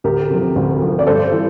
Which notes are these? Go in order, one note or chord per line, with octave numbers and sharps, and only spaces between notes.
D2 G4 A#4
C3 F3
D2
C3 F3
D5
G2 A4 C5
E3